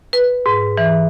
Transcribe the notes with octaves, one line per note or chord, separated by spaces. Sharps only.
B4
G#2
E3